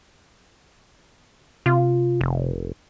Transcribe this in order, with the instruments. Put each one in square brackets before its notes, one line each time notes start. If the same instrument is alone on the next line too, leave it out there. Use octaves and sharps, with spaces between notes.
[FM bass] C3 [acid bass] F4
[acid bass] F1